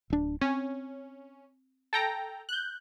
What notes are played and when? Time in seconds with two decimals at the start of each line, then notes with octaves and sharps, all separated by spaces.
0.10 D1 D4
0.41 C4 C#4
1.93 A4 G5 A#5
2.49 F#6 G6